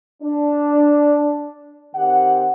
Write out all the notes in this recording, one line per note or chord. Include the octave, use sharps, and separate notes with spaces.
D4
D#3 C4 G4 F#5